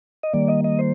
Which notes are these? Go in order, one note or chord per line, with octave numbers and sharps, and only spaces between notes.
D#5
D#3 G3 A#3 D5
D#5
D#5
C5